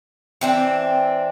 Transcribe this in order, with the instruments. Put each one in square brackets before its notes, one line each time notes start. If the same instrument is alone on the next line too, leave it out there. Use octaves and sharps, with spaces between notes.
[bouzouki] E3 C4 D4